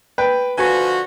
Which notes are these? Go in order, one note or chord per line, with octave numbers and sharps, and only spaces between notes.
B4 G5
D3 F3 F#4 B4 G#5